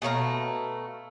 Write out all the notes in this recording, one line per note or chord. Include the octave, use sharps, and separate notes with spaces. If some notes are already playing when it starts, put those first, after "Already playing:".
B2 A3 F5 A#5